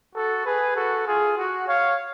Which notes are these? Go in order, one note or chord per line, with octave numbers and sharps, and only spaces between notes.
F#4 A4
G#4 B4
F#4 A4
F4 G#4
F#4
C#5 F5